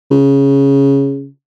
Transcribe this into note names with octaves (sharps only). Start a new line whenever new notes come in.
C#3